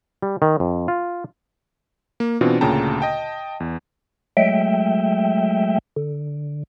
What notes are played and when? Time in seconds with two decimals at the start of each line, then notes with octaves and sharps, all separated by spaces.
0.22 G3
0.42 D#3
0.60 F2
0.88 F4
2.20 A#3
2.41 B2 E3 C4 D4 F4
2.61 D2 A#2 C#3 G5 A5 A#5
3.00 D#5 G5 A5
3.60 E2
4.37 F#3 G#3 A3 E5 G5
5.96 D3